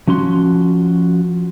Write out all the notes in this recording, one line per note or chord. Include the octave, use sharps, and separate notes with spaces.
F3 C#4 F#4 C6